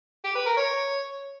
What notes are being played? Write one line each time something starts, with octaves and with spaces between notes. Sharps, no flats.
G4
B4
A#4
C#5